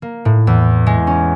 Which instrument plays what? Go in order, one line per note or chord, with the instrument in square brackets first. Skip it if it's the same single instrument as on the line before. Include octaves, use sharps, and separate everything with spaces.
[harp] A#3
A2
E2
G#3
C#4